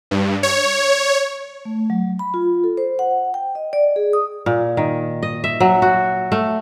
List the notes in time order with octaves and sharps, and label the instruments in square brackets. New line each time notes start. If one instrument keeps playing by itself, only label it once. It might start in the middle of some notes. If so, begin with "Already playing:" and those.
[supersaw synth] G2
C#5
[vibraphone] A3
F#3
B5
F4
A4
C5
F#5
G5
D#5
D5
G#4
D#6
[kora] A#2
D#3
D#5
E5
F#3
F#4
A3